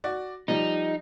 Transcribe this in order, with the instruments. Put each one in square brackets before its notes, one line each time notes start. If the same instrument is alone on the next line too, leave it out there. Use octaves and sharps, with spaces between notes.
[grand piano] F#4 D5
[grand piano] F3 G3 [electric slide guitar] D#4